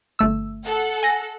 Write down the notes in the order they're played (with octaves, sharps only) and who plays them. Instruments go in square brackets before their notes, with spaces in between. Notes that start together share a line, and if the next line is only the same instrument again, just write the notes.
[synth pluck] G1 A3 E6
[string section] A4 F#5
[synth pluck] G#5 A#6